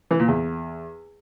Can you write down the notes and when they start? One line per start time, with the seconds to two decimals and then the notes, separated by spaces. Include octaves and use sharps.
0.11 E3
0.19 A#2
0.28 E2